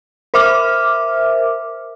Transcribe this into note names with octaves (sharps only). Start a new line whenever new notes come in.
A#4 C5 E5 D6 F6